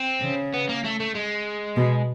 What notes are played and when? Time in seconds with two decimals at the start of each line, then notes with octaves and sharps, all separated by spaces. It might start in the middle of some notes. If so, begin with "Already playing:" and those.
Already playing: C4
0.22 C#3
0.54 B3
0.69 A#3
0.85 A3
1.00 A3
1.15 G#3
1.76 B2